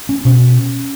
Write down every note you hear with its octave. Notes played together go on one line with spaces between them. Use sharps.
C#4
B2 C#4